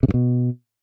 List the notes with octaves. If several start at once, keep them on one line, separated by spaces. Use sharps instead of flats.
C3
G2
B2